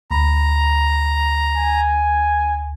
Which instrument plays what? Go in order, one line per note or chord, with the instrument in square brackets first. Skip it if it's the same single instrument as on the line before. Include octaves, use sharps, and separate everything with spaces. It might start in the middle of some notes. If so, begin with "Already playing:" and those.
[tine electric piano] D2 B5 [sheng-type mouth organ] A#5
[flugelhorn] G#5